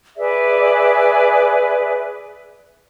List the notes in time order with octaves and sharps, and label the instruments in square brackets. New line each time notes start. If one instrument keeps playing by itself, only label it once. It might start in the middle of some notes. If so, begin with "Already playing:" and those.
[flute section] G#4 B4 D5 E5